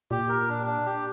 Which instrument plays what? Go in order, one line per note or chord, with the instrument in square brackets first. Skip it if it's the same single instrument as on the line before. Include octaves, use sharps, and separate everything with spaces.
[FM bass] A#2 [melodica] G4
[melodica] A#4
D4
D4
G4